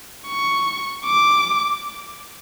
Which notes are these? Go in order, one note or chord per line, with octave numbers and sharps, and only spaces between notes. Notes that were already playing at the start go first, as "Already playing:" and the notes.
C#6
D6